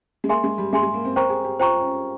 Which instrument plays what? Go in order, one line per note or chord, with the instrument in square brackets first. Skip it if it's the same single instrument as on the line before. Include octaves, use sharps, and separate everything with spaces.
[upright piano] G#3
[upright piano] A#3 [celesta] G#4 E5 G#5 C6
[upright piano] G#3
G3
[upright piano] G#3 [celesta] G#4 E5 G#5 C6
[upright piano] G#3
A#3
C4
[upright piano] A#4 [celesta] C5 G5 A#5 C#6
[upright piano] G#4
G4
[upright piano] F4 [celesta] C5 G5 A#5 C#6
[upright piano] C#4